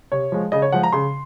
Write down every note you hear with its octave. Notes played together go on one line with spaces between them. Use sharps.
C3 C#5
F3 G#3
C#3 D#5
C#5
F3 G#3 F#5
A#5
C#3 C6